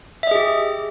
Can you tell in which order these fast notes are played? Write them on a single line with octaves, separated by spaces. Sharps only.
E5 D#5 G#4 G4